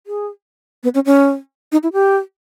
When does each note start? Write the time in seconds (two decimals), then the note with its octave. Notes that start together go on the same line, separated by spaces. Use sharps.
0.07 G#4
0.83 B3
0.95 C#4
1.06 C#4
1.72 D#4
1.83 E4
1.93 G4